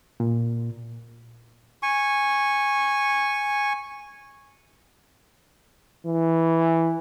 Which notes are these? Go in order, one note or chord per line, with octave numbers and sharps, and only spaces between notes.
A#2
G#5 C#6
E3